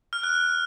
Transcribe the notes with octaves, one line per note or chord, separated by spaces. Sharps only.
F6
F#6